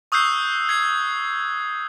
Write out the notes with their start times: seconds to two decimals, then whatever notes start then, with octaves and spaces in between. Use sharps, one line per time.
0.12 C#6 D#6 E6 F#6 G6 C7
0.69 G#6 C7